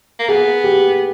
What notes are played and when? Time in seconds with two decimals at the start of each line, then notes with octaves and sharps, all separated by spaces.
0.19 A#3
0.28 B3 G#4
0.64 G4